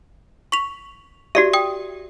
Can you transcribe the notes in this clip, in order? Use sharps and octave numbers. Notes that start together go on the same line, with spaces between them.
C#6 B6 F7
F#4 G4 D5 E5
G5 D#6